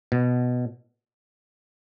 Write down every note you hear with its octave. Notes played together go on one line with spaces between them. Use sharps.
B2